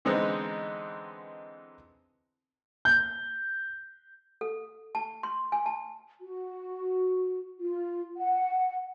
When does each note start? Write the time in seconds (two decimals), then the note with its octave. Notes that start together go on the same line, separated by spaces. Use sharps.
0.05 D3 E3 G#3 B3 C4 D#4
2.85 G6
4.41 A4
4.95 A5
5.23 C6
5.52 G#5
5.66 A5
6.22 F#4
7.59 F4
8.16 F#5